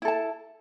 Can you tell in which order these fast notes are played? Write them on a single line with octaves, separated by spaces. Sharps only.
E4 A4 A5